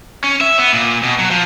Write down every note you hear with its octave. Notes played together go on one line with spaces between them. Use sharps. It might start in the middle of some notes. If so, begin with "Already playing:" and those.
C#4
E5
B3
A#2
B2
F#3
F3